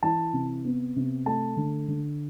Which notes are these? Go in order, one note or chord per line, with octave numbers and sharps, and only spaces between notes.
E3 A5
C3
B3
C3
A3 A5
D3
D3